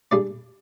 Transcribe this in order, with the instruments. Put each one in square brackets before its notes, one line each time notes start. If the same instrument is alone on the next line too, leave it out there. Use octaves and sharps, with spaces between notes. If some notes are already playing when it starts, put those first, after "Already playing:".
[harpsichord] G3 D4 G#4 D5